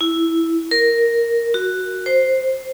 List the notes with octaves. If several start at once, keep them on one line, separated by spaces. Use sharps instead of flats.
E4
A#4
F#4
C5